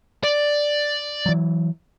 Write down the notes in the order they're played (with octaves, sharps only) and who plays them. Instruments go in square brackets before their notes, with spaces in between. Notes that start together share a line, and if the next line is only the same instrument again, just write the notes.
[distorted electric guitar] D5
[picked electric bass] E3 F#3